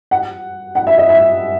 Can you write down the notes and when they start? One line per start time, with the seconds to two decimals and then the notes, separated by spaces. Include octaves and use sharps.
0.11 F#5
0.75 F#5
0.87 E5
0.98 D#5
1.09 E5